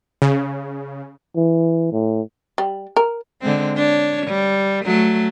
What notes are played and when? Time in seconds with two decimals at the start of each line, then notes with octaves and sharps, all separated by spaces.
0.22 C#3
1.36 E3
1.92 A2
2.58 G3
2.97 A#4
3.41 D3 G#3 C4
3.77 D4 C#5
4.27 G3
4.85 F#3 A3